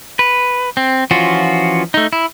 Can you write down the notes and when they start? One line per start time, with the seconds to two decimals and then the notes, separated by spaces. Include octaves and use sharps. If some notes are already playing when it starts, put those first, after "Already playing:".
0.19 B4
0.77 C4
1.11 E3 F3 C#4 F4 F#4
1.94 A3 D#4
2.13 E4